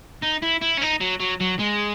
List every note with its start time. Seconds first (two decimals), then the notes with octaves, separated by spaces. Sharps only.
0.22 D#4
0.42 E4
0.61 E4
0.77 C#4
0.81 D#4
1.01 F#3
1.20 F#3
1.40 F#3
1.59 G#3